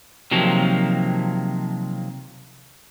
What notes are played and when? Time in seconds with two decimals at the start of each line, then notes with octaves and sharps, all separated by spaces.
0.31 C3 D#3 F3 F#3 A#3